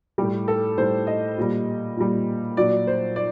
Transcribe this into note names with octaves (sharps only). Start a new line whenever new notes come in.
A2 G3 G4
A4
A2 G3 C5
D#5
A#2 G3
A#2 G3
A#2 F#3 D5
C5
D5